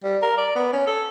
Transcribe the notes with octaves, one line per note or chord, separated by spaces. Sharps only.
G3
A#4
D5
B3
C#4
A4